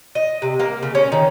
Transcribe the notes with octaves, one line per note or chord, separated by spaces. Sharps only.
D#5
C3
A#3
C#3
C#4
D#3